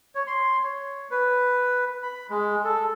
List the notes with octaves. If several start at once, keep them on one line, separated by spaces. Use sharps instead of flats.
C#5
C6
C#5
B4
B5
G#3
A4